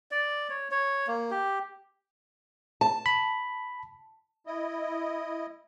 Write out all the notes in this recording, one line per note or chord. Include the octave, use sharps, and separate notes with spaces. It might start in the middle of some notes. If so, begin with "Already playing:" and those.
D5
C#5
C#5
A#3
G4
A5
B5
E4 D#5